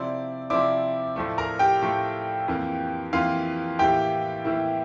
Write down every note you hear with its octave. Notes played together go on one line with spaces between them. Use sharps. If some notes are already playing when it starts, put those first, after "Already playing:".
Already playing: C3 F3 C4 E4 D5
C3 F3 C4 E4 D5 D6
A2 F3 A3
A#4 A#5
G4 G5
A2 F3 A3
F2 E3 A#3
F2 E3 A#3 F4 F5
A2 E3 A#3 E4 G4 G5
A2 E3 A#3 E4